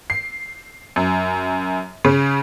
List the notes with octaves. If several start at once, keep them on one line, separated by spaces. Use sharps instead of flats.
C7
F#2
C#3